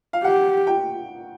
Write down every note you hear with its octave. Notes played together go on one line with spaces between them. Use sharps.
F5
G4 F#5
G5